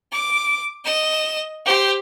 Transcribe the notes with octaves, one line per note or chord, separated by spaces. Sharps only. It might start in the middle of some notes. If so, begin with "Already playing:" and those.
D6
D#5 E7
G4 C5